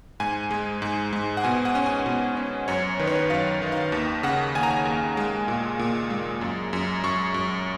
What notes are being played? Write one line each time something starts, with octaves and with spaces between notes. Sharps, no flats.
G#2 G#5
G#3
G#2
G#2
F#5
B2 G#5
F#5
C#4
G#5
B2
C#4
F#2 C#5
D#3 B4
C#5
B4
F#2 F5
D#3
F5
D#2
C#3 F#5
D#2 G#5
A#5
G#5
D#2
G#3
A#2
A#2
G#3
F#2
F#2
F#2 C#6
F#2